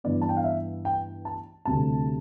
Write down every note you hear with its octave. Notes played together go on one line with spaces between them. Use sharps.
G2 E3 B3 D5
A5
G5
F5
E5
G5
A5
D2 C3 G3 A5